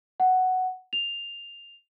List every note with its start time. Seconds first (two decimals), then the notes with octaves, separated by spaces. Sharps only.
0.20 F#5
0.93 F7